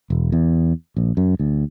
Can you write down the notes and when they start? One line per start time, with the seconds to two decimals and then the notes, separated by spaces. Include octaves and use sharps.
0.10 E1
0.32 E2
0.97 A#1
1.17 F#2
1.39 D2